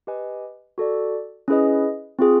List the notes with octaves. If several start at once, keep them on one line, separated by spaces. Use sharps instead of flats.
G4 B4 D#5 G#5
F#4 A4 D5
C#4 E4 G#4 B4 D#5
C4 F4 G#4